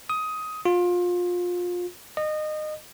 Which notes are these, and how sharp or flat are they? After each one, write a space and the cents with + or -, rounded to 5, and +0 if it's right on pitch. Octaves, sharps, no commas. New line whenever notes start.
D#6 +15
F4 +25
D#5 -25